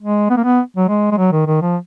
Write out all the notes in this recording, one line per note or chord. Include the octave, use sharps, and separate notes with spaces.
G#3
B3
A#3
B3
F#3
G#3
G#3
F#3
D#3
D#3
F3